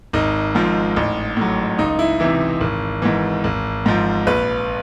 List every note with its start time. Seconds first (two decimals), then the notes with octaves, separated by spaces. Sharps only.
0.13 G#1 D#4
0.55 G#2 F3
0.96 A1
1.37 A2 F#3
1.78 C#2 D#4
1.99 E4
2.20 C3 E3 E4
2.61 G#1
3.02 G#2 E3
3.44 G#1
3.86 G#2 F3
4.27 A#1 B4